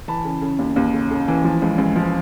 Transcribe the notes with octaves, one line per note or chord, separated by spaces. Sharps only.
E3 A5 B5
C#3
C#3
D#2
D#2
C#3
C#3
E3
F3
C#2
C#2
F3